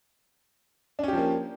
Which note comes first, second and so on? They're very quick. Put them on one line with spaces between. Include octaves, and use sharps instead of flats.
D4 C#4 G4 F3 A#3